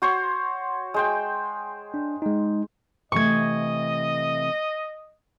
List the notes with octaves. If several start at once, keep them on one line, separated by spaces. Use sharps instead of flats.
F#4 C5 C#5
G#3 C5 G5
D4
G#3 D#4
C3 E3 A3 D#5 C#6 G#6